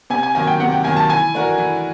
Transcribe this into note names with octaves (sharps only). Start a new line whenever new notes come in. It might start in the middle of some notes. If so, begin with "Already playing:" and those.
C3 G#5
G#5
D#3 F#3 A#3 G#5
G5
C3 F#5
G5
D#3 F#3 A#3 G#5
A5
E3 G#5
A3 D4 F#4 A#4
E3